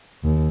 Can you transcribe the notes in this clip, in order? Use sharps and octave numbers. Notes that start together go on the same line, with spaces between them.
D#2